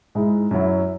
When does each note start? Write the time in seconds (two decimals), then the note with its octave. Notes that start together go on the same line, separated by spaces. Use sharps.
0.15 G#2 G#3 E4
0.51 F#2 F#3 E4